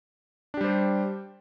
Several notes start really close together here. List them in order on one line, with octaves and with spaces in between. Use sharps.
D4 G4 G3 C5